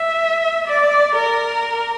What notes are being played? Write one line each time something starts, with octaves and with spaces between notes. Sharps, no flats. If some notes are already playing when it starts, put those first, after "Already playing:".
Already playing: E5
D5
A#4